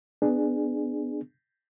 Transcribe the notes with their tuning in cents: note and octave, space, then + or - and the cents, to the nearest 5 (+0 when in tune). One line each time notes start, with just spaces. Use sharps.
B3 +20 D4 +20 G#4 +0